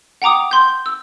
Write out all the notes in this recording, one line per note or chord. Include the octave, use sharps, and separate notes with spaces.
F#5 G5 A#5 D6 D#6
C6 G6
E6